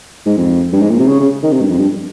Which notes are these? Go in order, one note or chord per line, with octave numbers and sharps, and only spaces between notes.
G#2
F2
G2
G#2
A#2
C3
C#3
C#3
D#3
C3
G2
F2
G2